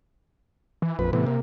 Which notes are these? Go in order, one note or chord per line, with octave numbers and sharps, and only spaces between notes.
E3
A#1 F2 B4
A2 C3 E3 B3
A#3